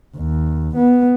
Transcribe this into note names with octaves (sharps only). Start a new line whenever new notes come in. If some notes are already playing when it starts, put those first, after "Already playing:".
D#2
B3